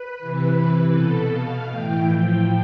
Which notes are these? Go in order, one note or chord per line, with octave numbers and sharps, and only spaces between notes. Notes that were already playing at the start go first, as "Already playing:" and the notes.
Already playing: B4
C3 E3
C3 E3
B2 A4
B2 F5
A2 E3 G5
A2 F3 G5